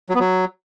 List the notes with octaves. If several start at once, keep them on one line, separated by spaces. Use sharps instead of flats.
F#3
B3
F#3